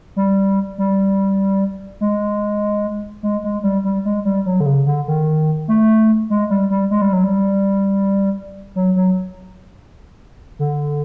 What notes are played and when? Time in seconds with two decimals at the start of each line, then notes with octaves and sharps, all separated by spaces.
0.16 G3
0.78 G3
2.01 G#3
3.23 G#3
3.44 G#3
3.63 G3
3.84 G3
4.05 G#3
4.25 G3
4.46 F#3
4.60 D3
4.66 C#3
4.86 D3
5.08 D#3
5.68 A3
6.30 G#3
6.50 G3
6.70 G3
6.91 G#3
7.02 G3
7.13 F#3
7.24 G3
8.76 F#3
8.96 F#3
10.59 D3